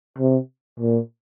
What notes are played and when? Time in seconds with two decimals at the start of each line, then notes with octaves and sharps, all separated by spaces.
0.19 C3
0.80 A#2